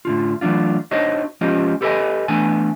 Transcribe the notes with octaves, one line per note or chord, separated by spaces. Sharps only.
A2 D3 F4
E3 F#3 A3 D4 F4
D4 D#4 F#4 C5 C#5 D#5
F3 G#3 C#4 F4 G4 D#5
G4 A4 B4 C5 D#5 G#5
E3 A3 B3 D4 G#5